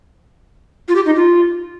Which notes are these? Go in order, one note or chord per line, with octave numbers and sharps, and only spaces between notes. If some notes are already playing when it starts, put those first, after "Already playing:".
F4
G4
D#4
F4